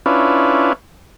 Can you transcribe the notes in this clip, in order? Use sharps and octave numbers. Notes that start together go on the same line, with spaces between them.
C#4 D4 E4 F4 B4